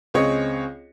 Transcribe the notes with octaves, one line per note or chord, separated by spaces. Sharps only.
C#2 C4 G#4 C#5 D#5 C#7